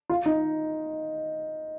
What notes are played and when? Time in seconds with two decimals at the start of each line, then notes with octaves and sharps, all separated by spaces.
0.09 F4
0.26 D#4